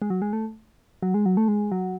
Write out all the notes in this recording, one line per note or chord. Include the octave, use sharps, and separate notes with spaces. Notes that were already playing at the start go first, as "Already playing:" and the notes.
G#3
F#3
G#3
A3
F#3
G#3
F#3
A3
G#3
F#3